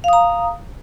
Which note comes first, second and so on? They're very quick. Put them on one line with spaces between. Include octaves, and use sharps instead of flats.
F5 D#6 A#5